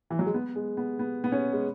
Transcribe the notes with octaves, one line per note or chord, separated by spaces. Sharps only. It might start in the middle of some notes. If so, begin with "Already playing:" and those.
E3
F#3
G#3
B3
G#3
B3
B3
B3
C#4
G#3